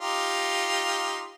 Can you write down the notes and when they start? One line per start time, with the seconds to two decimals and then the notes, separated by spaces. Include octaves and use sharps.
0.01 D#4 F4 G4